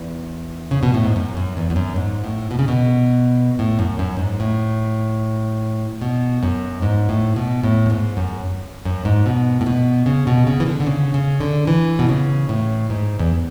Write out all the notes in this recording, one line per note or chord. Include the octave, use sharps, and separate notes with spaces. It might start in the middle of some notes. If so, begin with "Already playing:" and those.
Already playing: E2
C#3
B2
A2
G#2
F#2
F#2
E2
E2
F#2
G#2
A2
B2
C#3
B2
A2
F#2
F#2
G#2
A2
B2
F#2
G#2
A2
B2
A2
F#2
G#2
F#2
F#2
G#2
B2
A2
B2
C#3
B2
C#3
E3
D3
D3
C#3
C#3
D3
E3
B2
C#3
A2
G#2
E2